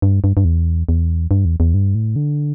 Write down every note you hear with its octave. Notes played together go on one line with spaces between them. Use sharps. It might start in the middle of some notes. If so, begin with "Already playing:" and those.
G2
G2
G2
E2
E2
G2
E2
E2
G2
A2
D3